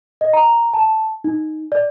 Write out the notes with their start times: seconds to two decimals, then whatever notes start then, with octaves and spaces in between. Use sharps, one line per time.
0.21 D#5
0.33 A#5
0.74 A5
1.24 D#4
1.72 D5